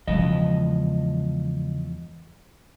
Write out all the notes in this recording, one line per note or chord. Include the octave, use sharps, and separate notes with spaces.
E2 C#3 F3 G#3 D#5